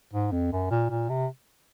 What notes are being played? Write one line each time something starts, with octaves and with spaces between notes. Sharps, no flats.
G#2
F2
F#2
A#2
A#2
C3